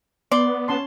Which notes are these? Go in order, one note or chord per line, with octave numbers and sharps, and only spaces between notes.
B3 D5 C6
C#4 A5 C6